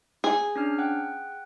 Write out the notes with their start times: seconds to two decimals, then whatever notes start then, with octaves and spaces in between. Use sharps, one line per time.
0.24 G#4
0.56 C#4 D4 F6
0.78 F#5 G5 F#6